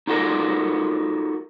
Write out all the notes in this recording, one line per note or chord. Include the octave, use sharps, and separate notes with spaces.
D#4 F4 F#4 A4 A#4 D5